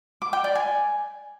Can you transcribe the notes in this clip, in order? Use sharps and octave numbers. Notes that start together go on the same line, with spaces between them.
D6
G5
D5
G#5